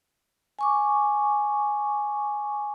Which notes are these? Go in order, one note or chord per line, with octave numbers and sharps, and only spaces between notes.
G#5 C#6 D6